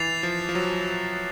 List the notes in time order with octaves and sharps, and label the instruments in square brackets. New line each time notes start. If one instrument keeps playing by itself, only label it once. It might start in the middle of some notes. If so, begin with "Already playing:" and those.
Already playing: [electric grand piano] E3 [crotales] A6 C7 F7
[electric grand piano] F3
F3
F#3